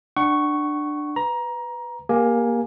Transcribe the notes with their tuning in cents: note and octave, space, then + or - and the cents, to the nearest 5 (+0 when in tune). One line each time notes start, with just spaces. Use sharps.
D4 +15 F#5 +30 C#6 +0
B4 +10 A#5 +20
A#3 +15 G4 +30 G#5 +0